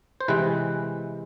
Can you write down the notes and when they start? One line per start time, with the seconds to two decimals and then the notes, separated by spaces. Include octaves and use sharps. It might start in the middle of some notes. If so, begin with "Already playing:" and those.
0.21 C5
0.28 C3 E3 G#3 C4 B4